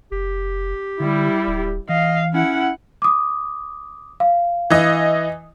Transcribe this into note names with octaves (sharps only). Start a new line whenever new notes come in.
F1 G4
D3 G3 E4
D1
E3 D#5 F5
C#4 E4 F#5
D6 D#6
F5
E3 D#5